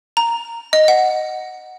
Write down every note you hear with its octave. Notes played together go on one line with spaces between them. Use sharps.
A#5
D#5
F#5